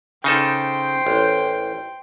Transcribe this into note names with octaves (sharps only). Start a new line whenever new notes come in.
C#3 D#4 A4 C5 G5
A1